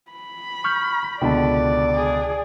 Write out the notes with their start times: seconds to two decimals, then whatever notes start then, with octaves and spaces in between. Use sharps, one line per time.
0.11 B5
0.64 C#6 F6 G6
1.21 C#2 B2 D3 D5 G5 A5
1.95 G#4